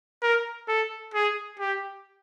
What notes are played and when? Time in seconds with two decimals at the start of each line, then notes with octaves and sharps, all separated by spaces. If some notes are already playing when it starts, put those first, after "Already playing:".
0.22 A#4
0.68 A4
1.14 G#4
1.60 G4